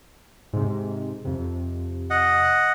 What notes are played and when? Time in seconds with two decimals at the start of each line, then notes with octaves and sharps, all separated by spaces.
0.53 G#2 C3
1.25 F2 C3
2.10 D#5 F#5